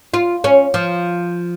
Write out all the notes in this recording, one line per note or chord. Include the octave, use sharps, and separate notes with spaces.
F4
C#4
F3